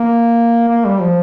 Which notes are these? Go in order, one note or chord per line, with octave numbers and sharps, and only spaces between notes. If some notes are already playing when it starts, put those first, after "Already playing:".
Already playing: A#3
A#3
G3
F3